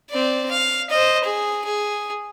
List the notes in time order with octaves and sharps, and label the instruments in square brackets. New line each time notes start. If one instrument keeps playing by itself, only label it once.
[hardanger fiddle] C4 D5
F5
C5 D#5
G#4
G#4